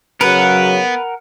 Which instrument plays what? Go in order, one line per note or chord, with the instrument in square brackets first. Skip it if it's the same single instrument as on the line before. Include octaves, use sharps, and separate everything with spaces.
[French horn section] C#3 F#3 [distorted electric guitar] B3 [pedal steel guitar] A#4 F#5 [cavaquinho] B4